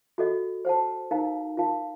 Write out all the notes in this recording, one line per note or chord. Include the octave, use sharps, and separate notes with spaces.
F#4 A4 D#5
C5 F#5 A5
D#4 A#4 F5 A#5
F4 A#4 F5 A5